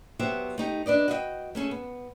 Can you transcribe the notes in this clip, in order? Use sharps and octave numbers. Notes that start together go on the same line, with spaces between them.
F#3 B3 G4 C5 E5
A3 D#4 G4
D4 B4 D5 D#5
F#4 D#5 E5 G5
A3 C#4 G#4 A4
B3